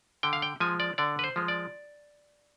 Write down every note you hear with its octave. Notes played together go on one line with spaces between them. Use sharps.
D3 G5
F5
G5
F3 G#3 G#5
D5
D3 D5
B4
C5
F3 G#3
D5